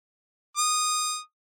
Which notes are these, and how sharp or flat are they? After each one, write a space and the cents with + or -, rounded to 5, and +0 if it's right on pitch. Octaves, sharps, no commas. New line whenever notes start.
D#6 -15